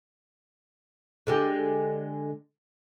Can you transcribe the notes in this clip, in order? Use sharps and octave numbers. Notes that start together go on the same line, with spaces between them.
D3 G#3 G4